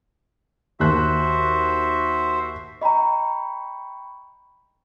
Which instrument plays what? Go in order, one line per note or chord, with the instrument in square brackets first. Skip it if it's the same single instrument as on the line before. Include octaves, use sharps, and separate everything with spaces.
[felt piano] D#2 F#6 [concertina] F#4 C5 E5
[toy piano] D#5 A#5 [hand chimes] G5 B5 C#6